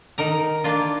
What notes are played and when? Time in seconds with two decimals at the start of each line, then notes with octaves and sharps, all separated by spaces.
0.18 D#3 D#4 A#4 A#5
0.64 A#3 D4 F4